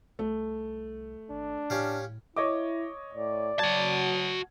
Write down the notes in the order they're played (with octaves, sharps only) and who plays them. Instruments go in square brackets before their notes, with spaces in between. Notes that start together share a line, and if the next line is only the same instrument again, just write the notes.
[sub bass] C2 [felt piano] A3
[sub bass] G#1 [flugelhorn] D4
[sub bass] A2 [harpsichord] C#4 G4 F5
[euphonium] E4 [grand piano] C#5 D#5 D6
[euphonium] A2 [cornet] D5
[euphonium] F#3 [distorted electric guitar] F#4 A5 [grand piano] G#6